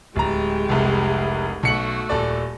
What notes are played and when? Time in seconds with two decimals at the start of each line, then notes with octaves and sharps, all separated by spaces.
0.16 D1 G#3 G4 A#5
0.69 F1 C2
1.63 B1 A3 F#4 C#7 F#7
2.10 D#1 A4 D5